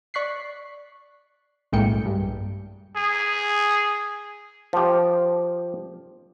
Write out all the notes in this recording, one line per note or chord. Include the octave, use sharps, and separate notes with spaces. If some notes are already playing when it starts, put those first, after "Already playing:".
D5 C#6 F#6 B6 C7
B1 A2 G#3 A#3 G5 C#7
G2
G#4
F3 G4